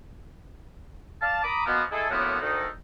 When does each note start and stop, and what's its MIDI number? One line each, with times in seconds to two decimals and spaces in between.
1.21 1.40 74
1.21 1.40 77
1.21 1.40 81
1.44 1.64 82
1.44 1.64 83
1.44 1.64 86
1.44 1.64 87
1.66 1.82 47
1.66 1.82 53
1.66 1.82 58
1.66 1.82 59
1.91 2.07 56
1.91 2.07 57
1.91 2.07 64
1.91 2.07 68
1.91 2.07 69
2.10 2.37 42
2.10 2.37 45
2.10 2.37 50
2.10 2.37 53
2.10 2.37 58
2.10 2.37 59
2.40 2.67 38
2.40 2.67 51
2.40 2.67 63
2.40 2.67 69